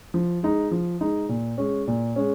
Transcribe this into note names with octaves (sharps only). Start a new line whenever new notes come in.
F3
G#3 D#4
F3
G#3 D#4
A#2
G#3 C#4
A#2
G#3 C#4